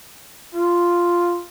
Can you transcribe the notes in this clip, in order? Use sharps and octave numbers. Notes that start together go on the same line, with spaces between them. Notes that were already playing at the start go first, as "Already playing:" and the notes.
F4